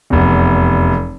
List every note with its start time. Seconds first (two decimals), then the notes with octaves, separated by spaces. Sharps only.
0.10 F1 E2